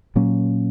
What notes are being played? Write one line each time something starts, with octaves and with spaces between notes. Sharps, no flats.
A#2 F#3 A#3 C#4